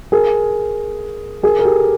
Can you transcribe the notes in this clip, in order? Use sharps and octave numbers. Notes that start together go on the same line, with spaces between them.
G#4 A#4
G#4 A#4
A#4
G4 A4